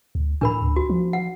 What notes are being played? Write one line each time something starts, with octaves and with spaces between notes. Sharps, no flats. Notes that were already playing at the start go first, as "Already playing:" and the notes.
D2
A2 D4 A#4 B5
D2
F#4
F3
F#5